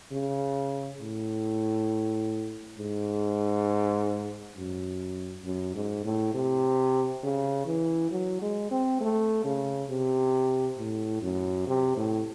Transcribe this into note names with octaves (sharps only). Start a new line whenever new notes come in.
C#3
A2
G#2
F#2
F#2
G#2
A2
C3
C#3
E3
F#3
G#3
C4
A3
C#3
C3
A2
F#2
C3
A2